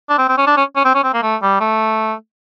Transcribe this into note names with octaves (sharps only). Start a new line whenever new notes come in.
D4
C4
C4
C#4
D4
C#4
C#4
C4
C#4
C4
A#3
A3
G3
A3